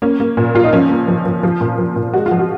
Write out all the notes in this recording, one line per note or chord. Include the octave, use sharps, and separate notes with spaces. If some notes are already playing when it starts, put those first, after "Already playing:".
A#3 C#4
A#3
A#2
A#2 F4
D#4
F3 C#4
A#3
F3
F3
F3 F4
A#2
F3
A#2
G#3 F#4
F4
F3
F#4